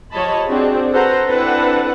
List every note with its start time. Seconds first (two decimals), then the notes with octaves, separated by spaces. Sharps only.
0.11 F3 G4 C#5 D#5 A5 B5
0.46 C4 D4 F#4 G#4
0.91 F#4 A4 B4 C5 F#5 A#5
1.26 C4 D4 E4 A4 B4 F#5